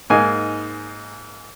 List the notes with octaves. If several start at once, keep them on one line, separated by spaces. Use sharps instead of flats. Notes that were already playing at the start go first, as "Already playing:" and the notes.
G#2 A#3 D#4 G#5